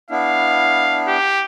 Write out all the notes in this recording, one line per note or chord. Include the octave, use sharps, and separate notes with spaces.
B3 D4 E4 F5
G4